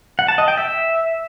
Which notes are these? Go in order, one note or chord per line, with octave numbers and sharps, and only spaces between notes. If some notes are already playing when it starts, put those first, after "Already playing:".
F#5
A5
D#5
G5
E5